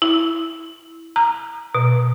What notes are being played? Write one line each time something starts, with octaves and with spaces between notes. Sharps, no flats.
E4
A#5
B2